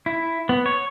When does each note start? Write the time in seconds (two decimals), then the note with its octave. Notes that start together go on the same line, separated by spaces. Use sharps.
0.06 E4
0.49 B3
0.66 C#5